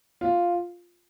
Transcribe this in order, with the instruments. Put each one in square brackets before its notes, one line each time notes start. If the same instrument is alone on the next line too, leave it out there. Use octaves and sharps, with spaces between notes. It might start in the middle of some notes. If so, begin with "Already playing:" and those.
[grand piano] F4